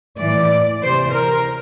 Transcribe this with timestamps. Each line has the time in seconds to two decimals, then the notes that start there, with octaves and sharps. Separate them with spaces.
0.17 A2 E3 D5
0.81 C3 E3 C5
1.13 A#4